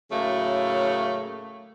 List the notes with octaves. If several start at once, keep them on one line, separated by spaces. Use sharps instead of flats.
A2 C#3 F#3 A3 A#3